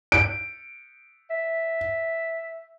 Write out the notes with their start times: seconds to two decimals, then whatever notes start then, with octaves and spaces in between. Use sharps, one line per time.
0.12 D7
1.30 E5